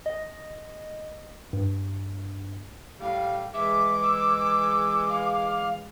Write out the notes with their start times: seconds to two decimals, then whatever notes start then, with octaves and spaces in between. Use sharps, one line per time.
0.06 D#5
1.53 G2
3.00 A2 G3 F5
3.54 E3 G#3 E5 D6
4.03 E6
5.09 F5